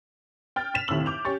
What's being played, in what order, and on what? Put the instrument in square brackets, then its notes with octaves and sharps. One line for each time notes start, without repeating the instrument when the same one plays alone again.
[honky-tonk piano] G5 F6 A6
A6 B6 E7 F7
D#2 A2 C3 E6 F#7
D6 G6 F7
C#4 G4 C#6 A6